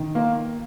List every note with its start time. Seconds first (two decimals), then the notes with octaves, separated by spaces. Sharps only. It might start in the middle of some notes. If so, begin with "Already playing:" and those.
Already playing: D#3
0.15 A#3